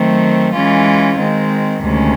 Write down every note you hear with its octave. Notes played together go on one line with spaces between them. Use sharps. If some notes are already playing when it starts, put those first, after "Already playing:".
Already playing: D#3 F#3 A3 C4
E3 G#3 C#4 F4
D#3 G#3 C4
D2 C3 D#3 G#3 C#4